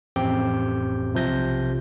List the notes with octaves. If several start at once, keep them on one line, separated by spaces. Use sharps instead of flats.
A1 F2 C4 G4 G5 G6
B1 C3 F3 G6 A#6